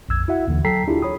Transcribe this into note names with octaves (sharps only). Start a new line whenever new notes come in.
A#1 F2 E6 G#6
E4 F#4 E5 F#5
D#2 D3 E3
F#3 A4 G5 A#5 B6 C7
D4 E4 F4 G4 G#4
C#5 B5 D#6